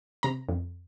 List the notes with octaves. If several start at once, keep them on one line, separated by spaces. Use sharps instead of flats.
C3 A#5
F2